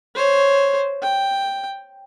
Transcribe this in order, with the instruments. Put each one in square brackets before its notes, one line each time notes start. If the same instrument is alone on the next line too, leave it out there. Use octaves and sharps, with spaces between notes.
[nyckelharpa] C5 C#5
G5